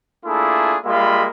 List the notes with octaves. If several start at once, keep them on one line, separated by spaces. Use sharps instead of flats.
A3 A#3 D4 E4 F4 G#4
G3 G#3 A#3 F4 E5 B5